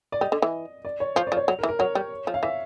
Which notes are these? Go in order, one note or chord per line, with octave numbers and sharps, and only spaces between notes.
D5
G3 D#5
D3
E3
D5
C#5
F3 C5
D5
F3
C#5
F#3
A#4
E3
A#4
F#3 C#5
G3
F3
F5
E3 E5